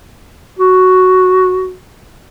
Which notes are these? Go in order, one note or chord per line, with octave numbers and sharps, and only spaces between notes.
F#4